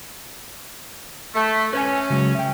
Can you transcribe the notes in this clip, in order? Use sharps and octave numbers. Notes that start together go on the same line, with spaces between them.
A3
C#4 B4 C#5 G#5
C#3 F#3 G#3
E5 G5